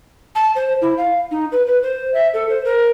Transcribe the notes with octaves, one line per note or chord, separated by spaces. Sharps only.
A5
C5
E4
F5
D#4
B4
B4
C5
E5
A4
C5
A#4